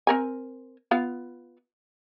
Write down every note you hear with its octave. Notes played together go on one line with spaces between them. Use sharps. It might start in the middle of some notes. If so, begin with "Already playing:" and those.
C4 A#4 G#5
B3 F4 F5